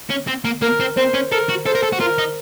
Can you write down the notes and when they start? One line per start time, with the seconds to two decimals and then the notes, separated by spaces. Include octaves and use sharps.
0.10 C#4
0.27 C4
0.45 A#3
0.62 A#3 A#4
0.80 C4
0.97 C4 C5
1.14 C#4
1.31 A4 A#4
1.49 F#4
1.66 A4 C5
1.75 A#4
1.83 A4
1.92 F#4
2.00 F4 A#4
2.18 D#4